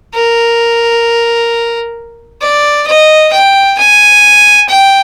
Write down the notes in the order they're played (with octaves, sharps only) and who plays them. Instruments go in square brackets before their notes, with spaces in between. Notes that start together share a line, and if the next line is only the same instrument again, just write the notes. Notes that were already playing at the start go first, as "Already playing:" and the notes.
[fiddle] A#4
D5
D#5
G5
G#5
G5